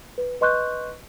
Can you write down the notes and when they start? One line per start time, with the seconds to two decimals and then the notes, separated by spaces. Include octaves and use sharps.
0.18 B4
0.41 B4 D#5 C6 C#6 F#6 G6